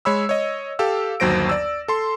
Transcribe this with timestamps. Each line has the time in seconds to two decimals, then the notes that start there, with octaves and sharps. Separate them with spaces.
0.05 G#3 C#5 B5 E6
0.29 C#5 D#5
0.79 G4 A4 F5 E6
1.20 G1 D#2 F#3 C5 A#6 D7
1.49 D5 E6
1.88 A4 C6